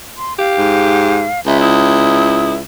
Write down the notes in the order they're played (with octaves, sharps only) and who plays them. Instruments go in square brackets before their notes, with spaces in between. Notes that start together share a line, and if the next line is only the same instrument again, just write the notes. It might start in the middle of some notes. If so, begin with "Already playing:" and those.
[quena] C6
[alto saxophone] G4 [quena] F5
[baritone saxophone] G#2
[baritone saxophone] C#2 [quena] E5
[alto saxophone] E4 [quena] D#6